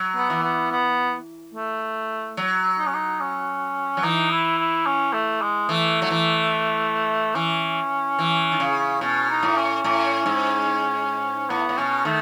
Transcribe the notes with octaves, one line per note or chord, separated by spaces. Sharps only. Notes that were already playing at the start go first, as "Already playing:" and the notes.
Already playing: F#3
B3
E3
B3
B3
A3
F#3
D#4
C#4
D#4
C#4
F#3
E3 D#4
E4
E4
C#4
A3
G#3
E3 A3
F#3
E3
E3 C#4
E3
D#3
C#3
B2 C#4
D#4
A2
C#4
A2
G#2
A2 B3
A2
B2 C#4
D#3 A3